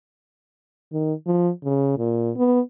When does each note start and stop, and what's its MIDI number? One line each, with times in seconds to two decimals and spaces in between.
0.92 1.13 51
1.26 1.50 53
1.64 1.97 49
1.98 2.31 46
2.36 2.60 59